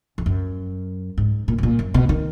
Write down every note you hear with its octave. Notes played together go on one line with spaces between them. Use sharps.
F2
F#2
G#2
A#2
G#2
A#2
F#2
B2
D#3